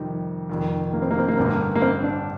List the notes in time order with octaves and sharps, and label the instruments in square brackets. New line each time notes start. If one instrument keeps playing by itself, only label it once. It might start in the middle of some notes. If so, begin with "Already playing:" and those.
Already playing: [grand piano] F2 C3 D#3 G3 [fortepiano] D#4
[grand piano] F1 F2 D#3
[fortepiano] A#3
C4
A#3
C4
A#3
[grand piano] A1 G2 D3 [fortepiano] C4
[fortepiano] A#3
A#3
C4
D4